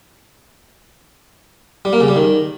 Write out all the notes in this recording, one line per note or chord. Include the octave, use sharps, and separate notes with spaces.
G3
A#3
C#3
G3
D#3